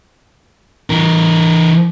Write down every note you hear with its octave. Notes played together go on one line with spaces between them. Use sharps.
E3 A#4